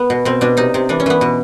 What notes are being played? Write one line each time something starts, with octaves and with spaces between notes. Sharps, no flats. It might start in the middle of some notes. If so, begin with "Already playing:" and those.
Already playing: B3
B2
B2 C4
B2 D4
C3 D#4
C3
E3 D4
C#4
E3 B3
B2